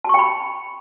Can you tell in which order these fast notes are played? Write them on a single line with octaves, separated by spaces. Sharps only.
A5 C#6 G5 B5